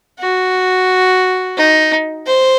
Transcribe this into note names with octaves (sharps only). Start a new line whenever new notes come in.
F#4
D#4
C5